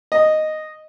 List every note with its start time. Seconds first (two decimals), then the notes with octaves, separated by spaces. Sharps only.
0.12 D#5